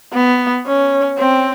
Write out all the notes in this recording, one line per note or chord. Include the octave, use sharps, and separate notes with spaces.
B3
C#4
C4